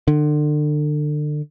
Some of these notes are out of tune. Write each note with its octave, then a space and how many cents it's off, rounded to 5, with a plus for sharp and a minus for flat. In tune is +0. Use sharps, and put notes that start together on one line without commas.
D3 +30